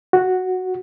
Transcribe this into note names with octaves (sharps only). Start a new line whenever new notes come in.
F#4